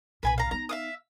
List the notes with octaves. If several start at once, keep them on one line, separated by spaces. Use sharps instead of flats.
B1 A#2 B4 G#5 B5
F5 A#5
B3 D#4 A#5
E5 F5 D#6